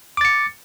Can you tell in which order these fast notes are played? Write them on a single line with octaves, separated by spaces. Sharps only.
D6 A6 C#7